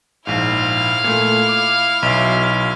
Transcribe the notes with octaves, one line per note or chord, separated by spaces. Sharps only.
A#1 G#2 E4 F5
A#2 A3
D6
B1 E5